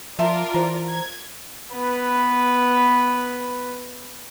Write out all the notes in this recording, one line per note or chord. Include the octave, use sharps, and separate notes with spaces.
F3 F4 A#4 D5 E5 A5 C6
E3 C5 A#5
G#6
B3 B4